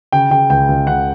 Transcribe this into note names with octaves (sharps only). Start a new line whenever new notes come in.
C#3 G5
C#3 G5
C#2 G5
C#2
C#3 F#5